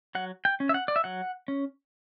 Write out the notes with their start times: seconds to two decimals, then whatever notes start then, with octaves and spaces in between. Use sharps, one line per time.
0.15 F#3 F#5
0.45 G5
0.60 C#4
0.69 E5
0.74 F#5
0.88 D5
0.96 E5
1.04 F#3 F#5
1.48 C#4